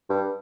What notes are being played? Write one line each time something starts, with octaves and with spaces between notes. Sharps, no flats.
G2